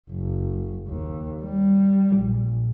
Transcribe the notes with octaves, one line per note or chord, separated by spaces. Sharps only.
F#1
D#2
G3
A#1